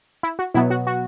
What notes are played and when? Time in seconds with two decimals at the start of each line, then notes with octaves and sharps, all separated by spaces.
0.23 E4
0.39 F#4
0.54 B2 F#3 B3 E4
0.70 F#4
0.87 F#4